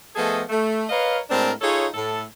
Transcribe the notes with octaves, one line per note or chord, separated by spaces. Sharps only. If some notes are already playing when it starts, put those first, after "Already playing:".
F3 A3 B3 G#4 A4 D#5
A3
A#4 B4 C#5 D#5 F5
A2 G#3 C4 D4 A#4 A5
D#4 F4 G#4 A4 C#5
A2 A4